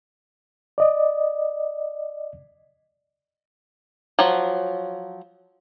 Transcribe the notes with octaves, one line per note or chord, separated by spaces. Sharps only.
D5 D#5
F3 F#3